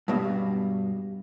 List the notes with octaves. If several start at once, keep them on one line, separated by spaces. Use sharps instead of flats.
G2 B2